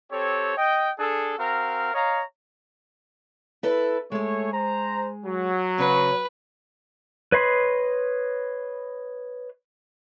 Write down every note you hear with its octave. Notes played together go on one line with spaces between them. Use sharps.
C4 G4 A4 C#5
D#5 G5
D4 G#4 A4
C4 F#4 A#4 F5 A#5
C#5 D#5 F5 A#5
E4 A4 B4
G#3 A3 G#4 C#5
C5 A#5
F#3
C#3 C#4 B4
B4 C#5 D#5 B5 C6